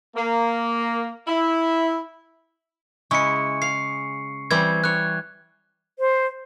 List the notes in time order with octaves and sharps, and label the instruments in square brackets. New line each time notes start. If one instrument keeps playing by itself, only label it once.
[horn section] A#3
E4
[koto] C#3 G#3 E4 [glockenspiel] C#6 C#7
[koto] F5 [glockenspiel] C7
[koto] E3 G3 C4 [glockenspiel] G#6
[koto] G3 C#5 [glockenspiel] F#6
[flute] C5